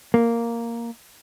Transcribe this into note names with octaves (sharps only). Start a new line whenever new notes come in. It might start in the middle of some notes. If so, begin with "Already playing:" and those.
A#3